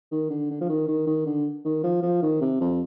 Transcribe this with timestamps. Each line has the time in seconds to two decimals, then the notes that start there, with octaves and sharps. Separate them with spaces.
0.12 D#3
0.30 D3
0.50 D3
0.61 F3
0.69 D#3
0.88 D#3
1.06 D#3
1.26 D3
1.65 D#3
1.84 F3
2.02 F3
2.22 D#3
2.41 C3
2.60 F2